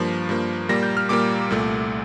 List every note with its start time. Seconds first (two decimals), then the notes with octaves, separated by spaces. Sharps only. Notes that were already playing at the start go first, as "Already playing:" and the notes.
Already playing: G2 F3 A#3
0.29 G2 F3 A#3
0.69 A#2 G3 A#3 A#6
0.83 G6
0.97 F6
1.09 A#2 G3 A#3 D6
1.50 C2 A#2 A3